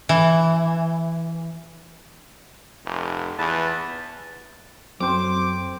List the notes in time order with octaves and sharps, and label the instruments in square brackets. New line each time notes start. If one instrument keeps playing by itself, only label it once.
[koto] E3
[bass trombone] F1
[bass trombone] E2 [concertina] B4 A5
[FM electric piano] F#2 [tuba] F#3 [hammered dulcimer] C4 C5 [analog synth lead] D6